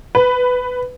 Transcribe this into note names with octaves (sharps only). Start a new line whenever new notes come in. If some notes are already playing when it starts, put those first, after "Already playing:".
B4